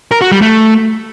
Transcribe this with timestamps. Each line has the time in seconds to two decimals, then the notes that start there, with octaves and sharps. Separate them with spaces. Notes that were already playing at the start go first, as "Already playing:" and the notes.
0.11 A#4
0.21 F#4
0.32 G3
0.42 A3